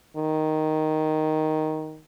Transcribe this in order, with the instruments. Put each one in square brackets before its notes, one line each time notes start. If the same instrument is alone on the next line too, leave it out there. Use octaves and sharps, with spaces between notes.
[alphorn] D#3